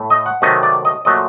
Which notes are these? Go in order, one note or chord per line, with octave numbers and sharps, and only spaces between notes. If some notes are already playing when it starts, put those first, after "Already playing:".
Already playing: A2 A3
D#5
F#5
C3 D#3 F#3 A3 D#5
D5
D#5
A#2 F#3 A3 D#5